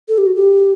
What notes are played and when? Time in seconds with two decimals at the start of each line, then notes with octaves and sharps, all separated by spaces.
0.09 A4
0.18 G4
0.26 F#4
0.35 G4